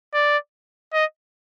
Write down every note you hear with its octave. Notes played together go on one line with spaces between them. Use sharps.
D5
D#5